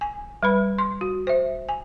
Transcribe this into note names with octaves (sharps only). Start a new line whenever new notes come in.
G#5
G3 B4 B5
C6
F#4
C5 E5
G#5